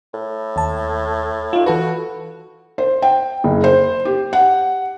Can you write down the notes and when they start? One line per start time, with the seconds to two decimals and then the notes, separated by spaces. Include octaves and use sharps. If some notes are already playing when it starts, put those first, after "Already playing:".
0.14 A2
0.56 D#2 A5
1.53 D#4 F4
1.66 E3 F#4 A4 B4
2.78 C5
3.02 G5
3.44 F#1
3.64 C5
4.05 G4
4.33 F#5